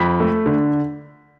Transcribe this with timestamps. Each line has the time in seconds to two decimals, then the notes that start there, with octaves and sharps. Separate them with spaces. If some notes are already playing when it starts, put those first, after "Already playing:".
Already playing: F2 B5 B6
0.20 A3
0.46 D3